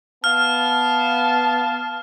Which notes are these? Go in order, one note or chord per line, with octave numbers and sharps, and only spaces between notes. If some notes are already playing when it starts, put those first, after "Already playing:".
B3 F5 A5 F6